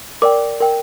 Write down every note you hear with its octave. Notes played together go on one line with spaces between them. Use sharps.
A#4 D5 G5 D6
A#4 G5